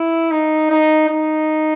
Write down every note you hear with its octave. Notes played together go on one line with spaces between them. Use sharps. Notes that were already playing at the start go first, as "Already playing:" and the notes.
Already playing: E4
D#4
D#4
D#4